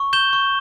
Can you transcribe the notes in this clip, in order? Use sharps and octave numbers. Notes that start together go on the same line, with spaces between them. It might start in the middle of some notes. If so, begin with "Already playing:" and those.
Already playing: C#6
G6 E7 G7
C#6